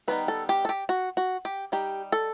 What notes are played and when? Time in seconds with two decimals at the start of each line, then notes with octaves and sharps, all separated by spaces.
0.08 D#3 G3 B3 D#4 B4
0.28 A4
0.49 G4
0.65 A4
0.69 G4
0.89 F#4
1.17 F#4
1.45 G4
1.72 G3 D#4 G4
2.12 A4